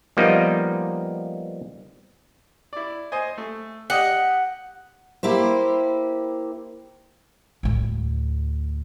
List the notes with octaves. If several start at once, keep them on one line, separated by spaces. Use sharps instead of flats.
F3 G3 A#3 B3 D#4 D#5
E4 D5
C5 D#5 G#5
A3
G4 D#5 F#5
A#3 E4 G4 C5
D2 A2